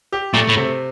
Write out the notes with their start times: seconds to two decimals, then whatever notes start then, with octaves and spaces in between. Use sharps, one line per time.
0.12 G4
0.34 A#2 A3
0.49 A2
0.57 C3